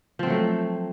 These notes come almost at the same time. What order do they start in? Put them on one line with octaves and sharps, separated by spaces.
F3 C4 F#3 A3